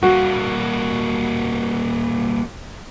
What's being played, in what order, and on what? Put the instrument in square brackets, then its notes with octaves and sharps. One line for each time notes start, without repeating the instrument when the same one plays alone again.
[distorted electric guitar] G3 A#3 [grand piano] F#4